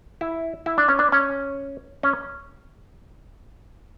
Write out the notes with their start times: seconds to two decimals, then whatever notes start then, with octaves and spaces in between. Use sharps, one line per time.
0.21 E4
0.66 E4
0.78 D4
0.88 C#4
0.99 D4
1.12 C#4
2.03 C#4